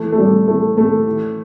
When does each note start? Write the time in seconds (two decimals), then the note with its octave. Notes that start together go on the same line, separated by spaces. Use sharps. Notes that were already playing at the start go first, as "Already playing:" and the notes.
Already playing: E3 A3
0.12 A3
0.18 A2 G3
0.48 E3 A3
0.77 A2 A3
1.07 E3